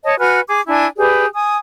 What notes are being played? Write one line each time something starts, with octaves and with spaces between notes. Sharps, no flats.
C#5 D#5 A5
F#4 B4 G#5 F6
G#4 D6
D4 E4 G#5
G4 G#4 B4 D5
G#5 D#6